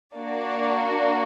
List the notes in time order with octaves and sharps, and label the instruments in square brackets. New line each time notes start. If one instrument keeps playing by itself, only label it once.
[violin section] A#3 D4 F#4 D5